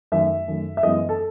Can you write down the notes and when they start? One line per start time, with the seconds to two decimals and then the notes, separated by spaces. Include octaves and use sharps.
0.12 F#2 D#3 A3 E5
0.48 F#2 D#3 A3
0.77 E5
0.83 F#2 E3 G#3 B3 D#5
1.09 A4